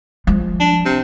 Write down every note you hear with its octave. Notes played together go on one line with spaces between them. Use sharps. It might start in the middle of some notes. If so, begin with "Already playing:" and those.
F3 G#3
D4
C3